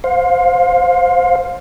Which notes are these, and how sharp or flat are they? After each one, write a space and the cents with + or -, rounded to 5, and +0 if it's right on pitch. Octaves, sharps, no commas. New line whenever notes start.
C5 +0 F5 +25